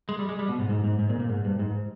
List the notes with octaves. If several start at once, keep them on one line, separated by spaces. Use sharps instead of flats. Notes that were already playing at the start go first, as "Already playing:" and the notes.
G#3
G3
G#3
G3
B2
G#2
G#2
G#2
G#2
A#2
A#2
G#2
G2
G#2